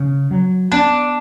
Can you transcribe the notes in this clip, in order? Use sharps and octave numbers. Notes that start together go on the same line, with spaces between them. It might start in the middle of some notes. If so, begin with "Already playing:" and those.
Already playing: C#3
F#3
B3 D4